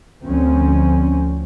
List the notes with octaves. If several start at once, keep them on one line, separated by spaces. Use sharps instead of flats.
D2 F3 C4 C#4